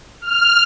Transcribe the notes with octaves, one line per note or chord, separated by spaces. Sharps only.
F6